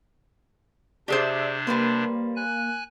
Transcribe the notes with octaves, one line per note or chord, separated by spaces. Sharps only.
C3 D4 G4 G#4 C5 D5 E5
G3 A#3 B4 C5
G#5 F#6